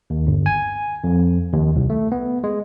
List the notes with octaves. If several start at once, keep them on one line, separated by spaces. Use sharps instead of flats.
D#2
G1
G#5
F2
D#2
C2
A3
B3
G#3